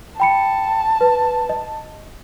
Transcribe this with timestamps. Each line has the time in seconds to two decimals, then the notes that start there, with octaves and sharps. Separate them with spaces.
0.20 G5 A5 B5 C#7
1.01 B4
1.49 D#5